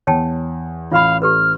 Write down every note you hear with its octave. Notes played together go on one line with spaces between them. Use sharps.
E2 C#5 G5 A5
A1 F4 F5 B5
G4 A4 B4 F6